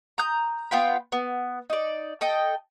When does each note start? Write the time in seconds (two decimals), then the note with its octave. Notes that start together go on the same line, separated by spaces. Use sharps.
0.18 A#5 D#6 G6
0.71 B3 F4 G5 B5
1.12 B3
1.70 D#4 D5
2.21 A4 D#5 G5